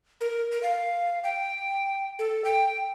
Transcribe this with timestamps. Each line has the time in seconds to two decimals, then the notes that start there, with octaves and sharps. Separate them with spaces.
0.21 A#4
0.52 A#4
0.63 F5
1.24 G5
2.19 A4
2.45 G5